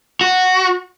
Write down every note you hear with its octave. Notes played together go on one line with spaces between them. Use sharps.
F#4